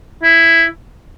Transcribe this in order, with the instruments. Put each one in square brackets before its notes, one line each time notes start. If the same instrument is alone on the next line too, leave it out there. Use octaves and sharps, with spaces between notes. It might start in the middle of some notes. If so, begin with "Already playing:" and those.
[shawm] E4